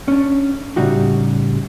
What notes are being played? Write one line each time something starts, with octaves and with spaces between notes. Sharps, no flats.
C#4 D4
A2 C#3 G3 D#4 F#4 G4